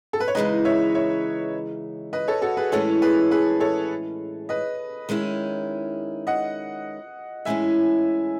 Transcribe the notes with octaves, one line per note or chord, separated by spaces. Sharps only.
A4
B4
C#5
C#3 E3 G#3 D#4 B4 D#5
C#5 E5
C#5 E5
B4 D#5
A4 C#5
F#4 A4
G#4 B4
A2 E3 G#3 C#4 E4 A4 C#5
G#4 B4
G#4 B4
A4 C#5
B4 D#5
D#3 G#3 C#4 E4
D#5 F#5
A2 E3 G#3 C#4 E4 E5 G#5